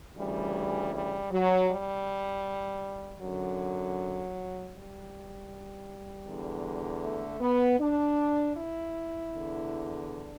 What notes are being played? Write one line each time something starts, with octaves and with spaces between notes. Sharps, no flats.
D2 C#3 E3 G3
G3
F#3
G3
F#2 D3 F#3
G3
E2 D3
A3
B3
D4
E4
E2 D3
D4